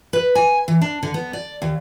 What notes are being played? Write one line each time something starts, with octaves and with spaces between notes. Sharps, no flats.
B4
G#5
E3
D4
D3
B3
D5
D#2